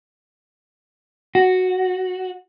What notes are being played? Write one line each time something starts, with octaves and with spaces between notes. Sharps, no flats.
F#4